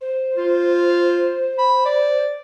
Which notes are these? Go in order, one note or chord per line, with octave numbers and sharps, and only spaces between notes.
C5
F4
B5
D5